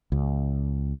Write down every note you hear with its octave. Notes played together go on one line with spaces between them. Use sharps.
C#2